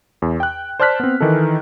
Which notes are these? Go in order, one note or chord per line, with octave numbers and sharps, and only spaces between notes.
E2
G5 F#6
C5 D5 A5 F6 F#6 B6
B3 C4
D#3 E3 D#4 A4